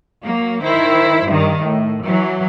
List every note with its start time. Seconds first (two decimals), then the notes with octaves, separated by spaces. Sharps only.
0.25 F#3 A#3
0.64 D#3 E4 C5
1.28 G2 D#3
1.62 A2
2.05 E3 F#3